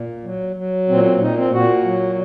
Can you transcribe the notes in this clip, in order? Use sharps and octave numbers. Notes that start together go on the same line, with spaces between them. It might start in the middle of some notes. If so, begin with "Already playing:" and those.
Already playing: A#2
F#3
F#3
A#2 C4
C4
A#2 D#4
C4
A#2 F#4
F#3